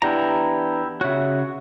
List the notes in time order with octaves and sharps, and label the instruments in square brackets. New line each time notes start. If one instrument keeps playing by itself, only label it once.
[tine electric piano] E3 B3 D4 [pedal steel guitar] E4 G4 A#5
[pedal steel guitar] C#3 F#4 [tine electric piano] C#5 E5